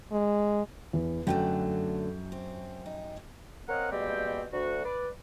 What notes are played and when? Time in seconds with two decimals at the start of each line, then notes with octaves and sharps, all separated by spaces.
0.12 G#3
0.93 E2
1.27 F#2 D3 F#3 A3 F#4 G5
2.32 C4
2.86 D#4
3.69 C4 A#4 C#5 D#5 F5 F#5
3.92 B2 G3 G#3 A#3 C4 G4
4.53 D2 F#4
4.85 B4 D5